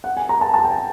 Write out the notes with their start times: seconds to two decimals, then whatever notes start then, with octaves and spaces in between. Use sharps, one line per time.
0.04 F#5
0.17 G#5
0.29 A#5
0.41 A5
0.54 A5
0.65 G5
0.70 G#5